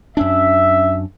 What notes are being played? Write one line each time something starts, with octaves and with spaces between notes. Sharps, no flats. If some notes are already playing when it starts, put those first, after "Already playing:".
F#2 C#4 D4 E5